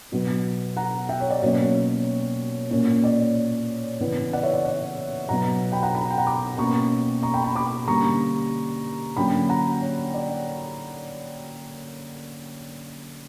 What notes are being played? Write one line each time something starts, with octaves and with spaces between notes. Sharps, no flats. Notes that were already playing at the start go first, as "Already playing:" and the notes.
B2 F#3 B3
F#5 A#5
E5 G5
C#5
D5
B2 F#3 A#3 C#4 C#5
A#2 A#3 C#4 C#5
D5
C#3 E3 B3
D5 F#5
C#5 E5
D5
D5 F#5
B2 F#3 B3 F#5 A#5
G5 B5
F#5 A#5
B5
A#5
G5
F#5 A#5
B5 D6
B2 A#3 C#4 A#5 C#6
A#5 C#6
G5 B5
G5 B5
B5 D6
D3 G3 A#3 C#4 A#5 C#6
D3 F#3 A#3 C#4 G5 B5
F#5 A#5
C#5
D5